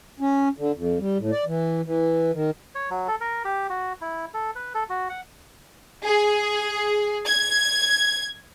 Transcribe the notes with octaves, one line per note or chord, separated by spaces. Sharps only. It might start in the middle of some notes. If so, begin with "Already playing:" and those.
C#4
D3
F2
G3
A2
D5
E3
E3
D#3
C#5
F#3
A4
A#4
G4
F#4
E4
A4
B4
A4
F#4
F#5
G#4
G#6